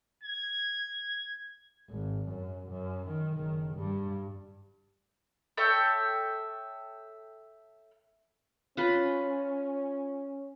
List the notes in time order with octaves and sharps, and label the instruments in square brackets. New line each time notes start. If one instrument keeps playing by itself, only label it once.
[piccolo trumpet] G#6
[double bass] G#1
F#2
F#2
D#3
F#1 D#3
G2 G3
[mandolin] A4 C#5 E5 G5
[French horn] C#4 [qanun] F4 B4 B5